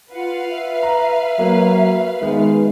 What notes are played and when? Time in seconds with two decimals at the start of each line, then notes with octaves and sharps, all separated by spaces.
0.11 F4 B4 F5 F#5
0.50 E5
0.83 A#5
1.39 F#3 A#3
2.22 D#3 G#3 B3